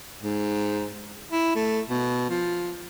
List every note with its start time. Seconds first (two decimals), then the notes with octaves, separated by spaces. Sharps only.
0.23 G#2
1.31 E4
1.56 A3
1.90 B2
2.30 F3